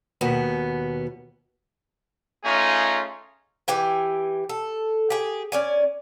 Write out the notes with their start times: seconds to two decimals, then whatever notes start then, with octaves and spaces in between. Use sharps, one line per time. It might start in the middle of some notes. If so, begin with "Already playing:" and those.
0.21 D#2 B2 B3
2.45 A3 C#4 D#4 F4 G#4
3.68 E3 G4 G5 G#5
4.49 A4
5.10 G4 G#4
5.52 C#4 D5 G#5